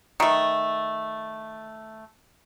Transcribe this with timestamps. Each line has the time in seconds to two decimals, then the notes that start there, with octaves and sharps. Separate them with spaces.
0.20 D#3 A3